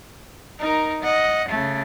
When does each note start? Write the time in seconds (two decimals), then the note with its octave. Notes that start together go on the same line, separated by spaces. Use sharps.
0.60 D#4 A#4
1.03 D#5 F#5
1.49 C#3 A3